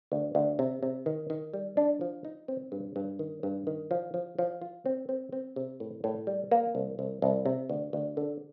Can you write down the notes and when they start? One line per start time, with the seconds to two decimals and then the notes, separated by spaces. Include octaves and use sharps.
0.12 D2
0.35 D2
0.59 C3
0.83 C3
1.06 D#3
1.30 D#3
1.53 G3
1.77 D4
2.01 F3
2.25 D#4
2.48 C4
2.72 G2
2.96 G2
3.19 D#3
3.43 G2
3.67 D#3
3.91 F3
4.14 F3
4.39 F3
4.62 F4
4.86 C4
5.09 C4
5.32 C4
5.56 C3
5.80 A2
6.04 A2
6.27 G3
6.51 A#3
6.75 C2
6.99 C2
7.22 C2
7.46 C3
7.69 D2
7.93 D2
8.17 D3